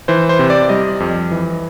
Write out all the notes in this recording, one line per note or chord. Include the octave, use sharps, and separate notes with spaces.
E3 C5
C5
C3
D5
G3 D#5
F2
E3